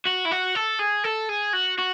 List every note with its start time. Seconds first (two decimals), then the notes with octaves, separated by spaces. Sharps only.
0.05 F#4
0.25 E4
0.31 F#4
0.55 A4
0.79 G#4
1.04 A4
1.29 G#4
1.53 F#4
1.78 F#4